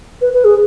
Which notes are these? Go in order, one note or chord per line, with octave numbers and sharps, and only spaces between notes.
B4
B4
G#4